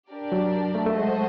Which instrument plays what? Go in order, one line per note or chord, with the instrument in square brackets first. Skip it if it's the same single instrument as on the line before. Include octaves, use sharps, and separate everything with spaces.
[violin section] D4 G4 A#4 D5
[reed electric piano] F#3
A3
A3
[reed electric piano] G#3 [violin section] F#4 A4 C5 D#5